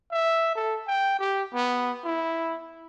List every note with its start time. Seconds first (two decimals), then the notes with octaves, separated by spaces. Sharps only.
0.12 E5
0.55 A4
0.87 G5
1.19 G4
1.54 B3
2.05 E4